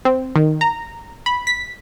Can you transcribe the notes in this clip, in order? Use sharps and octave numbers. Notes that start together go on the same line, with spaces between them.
C4
D#3
A#5
B5
B6